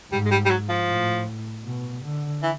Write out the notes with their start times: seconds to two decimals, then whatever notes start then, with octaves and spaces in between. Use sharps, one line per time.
0.12 G#2 G3
0.26 G#3
0.31 G3
0.46 G3
0.50 F#3
0.69 F3
0.89 A2
1.65 B2
2.03 D3
2.43 E3